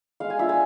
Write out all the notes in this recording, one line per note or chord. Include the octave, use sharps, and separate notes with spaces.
G#3 F5
G#5
D4 F4 E5
G#5